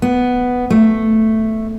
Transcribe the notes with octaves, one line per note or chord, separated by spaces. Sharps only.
B3
A3